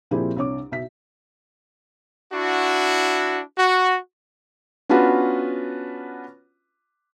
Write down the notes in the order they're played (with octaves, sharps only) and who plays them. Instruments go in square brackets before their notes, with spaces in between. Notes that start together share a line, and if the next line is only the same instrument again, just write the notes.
[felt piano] A#2 F3 C4 E4 G4 G#4
C2 D4 C#5 D6
B1 E5 B6
[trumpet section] D4 E4 F#4
F#4
[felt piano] B3 C#4 D4 F4 F#4 B4